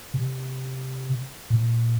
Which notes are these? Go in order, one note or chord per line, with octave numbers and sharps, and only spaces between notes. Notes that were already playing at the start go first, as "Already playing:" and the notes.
C3
A#2